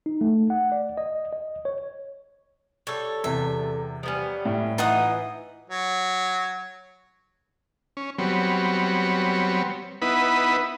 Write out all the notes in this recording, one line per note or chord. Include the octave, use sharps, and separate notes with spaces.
D#4
A3
F#5
D5
D#5
D#5
C#5
G3 A4 C#5
E2 C3 E5
F3 G3 B3 C#4
A2
E3 D#4 F4 D#5 F#5 D#6
F#3
C#4
F#3 G3 B3 C4 C#5
B3 D#4 E4 B4 F#5